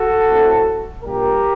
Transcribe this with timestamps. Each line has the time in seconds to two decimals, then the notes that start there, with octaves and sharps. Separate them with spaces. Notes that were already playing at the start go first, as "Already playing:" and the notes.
Already playing: F#4 A4
0.28 A2 A3 C4
1.03 A#1 A#2 G3 G4 A#4